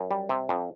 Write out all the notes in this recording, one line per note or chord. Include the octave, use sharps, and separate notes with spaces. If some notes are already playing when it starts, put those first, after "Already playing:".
Already playing: F#2
G3
C3
F2